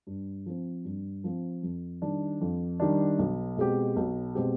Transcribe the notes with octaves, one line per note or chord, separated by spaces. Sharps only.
G2
F3 C4
G2
F3 C4
F2
D#3 G3 D4
F2
D#3 G3 D4
B1
B2 G#3 C4 G4
B1
B2 G#3 C4 G4